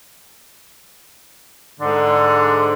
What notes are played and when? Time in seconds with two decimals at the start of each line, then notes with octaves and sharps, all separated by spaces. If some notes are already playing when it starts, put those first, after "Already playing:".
1.80 G#2 D3